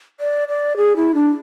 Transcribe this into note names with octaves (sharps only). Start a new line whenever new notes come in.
D5
D5
G#4
E4
D4